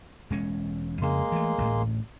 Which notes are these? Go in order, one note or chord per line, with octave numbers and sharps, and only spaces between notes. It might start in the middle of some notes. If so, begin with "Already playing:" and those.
E1 G#3 C#4
F2 C#3 G#3 A#3 C6
E3 A3
A1 D2 A2